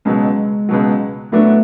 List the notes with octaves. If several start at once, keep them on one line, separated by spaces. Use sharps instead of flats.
C#2 B2 F#3 G#3
C#2 B2 F#3
A2 F#3 A3 B3 D4